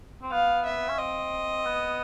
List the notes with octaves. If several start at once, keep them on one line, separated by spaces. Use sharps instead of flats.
C4
B3 F5
E5
C#4
C4 D#5
B3